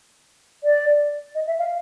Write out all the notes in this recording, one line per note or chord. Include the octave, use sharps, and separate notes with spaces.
D5
D#5
E5
F5